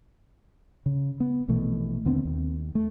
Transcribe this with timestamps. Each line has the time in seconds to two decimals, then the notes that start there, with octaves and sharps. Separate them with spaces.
0.86 C#3
1.20 B3
1.48 A#1 B2 E3 A3
2.05 D#2 D3 B3 C4
2.25 D#2
2.75 A3